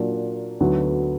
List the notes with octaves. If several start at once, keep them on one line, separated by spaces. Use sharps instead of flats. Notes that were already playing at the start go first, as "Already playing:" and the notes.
Already playing: A#2 F#3 A#3 D4
D2 D3 F#3 B3